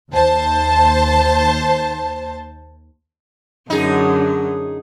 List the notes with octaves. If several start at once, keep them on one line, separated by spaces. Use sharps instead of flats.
D#2 C5 A5
F#2 D3 F#3 D#4 G#4